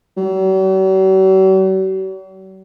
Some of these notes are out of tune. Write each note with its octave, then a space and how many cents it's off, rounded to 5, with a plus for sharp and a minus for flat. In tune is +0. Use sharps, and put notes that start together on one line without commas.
F#3 +45